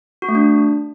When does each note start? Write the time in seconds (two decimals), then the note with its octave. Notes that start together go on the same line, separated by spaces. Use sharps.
0.22 F#4
0.29 A3
0.35 D4